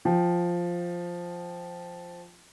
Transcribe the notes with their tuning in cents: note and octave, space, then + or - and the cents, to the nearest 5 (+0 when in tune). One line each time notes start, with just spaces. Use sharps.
F3 +0 G5 +0